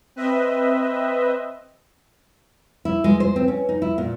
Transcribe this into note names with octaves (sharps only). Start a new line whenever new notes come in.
C4 B4 D#5 E5
E4
G#3
C5
C4
C#4
D#4
E4
A#2